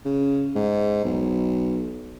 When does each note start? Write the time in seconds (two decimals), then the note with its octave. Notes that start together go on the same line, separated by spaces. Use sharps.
0.05 C#3
0.55 G#2
1.04 B1